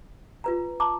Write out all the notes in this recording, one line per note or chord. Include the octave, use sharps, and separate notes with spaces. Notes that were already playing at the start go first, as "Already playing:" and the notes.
F4 B4 A#5
A5 A#5 D6